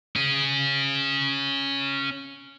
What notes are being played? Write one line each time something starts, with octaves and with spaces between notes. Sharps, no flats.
C#4 G#4